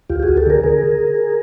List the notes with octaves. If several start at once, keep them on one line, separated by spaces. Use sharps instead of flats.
D2 F4 G4
G4
F#4 G#4
D2
G4 A4
D3 G#4 A#4
D3 G#4 A#4